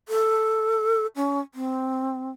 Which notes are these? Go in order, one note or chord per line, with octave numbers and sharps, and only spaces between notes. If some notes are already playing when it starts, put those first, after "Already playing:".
A4
C#4
C4